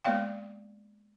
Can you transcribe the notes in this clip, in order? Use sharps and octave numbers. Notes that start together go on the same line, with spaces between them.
G#3 A#3 B3 D5 F5 G5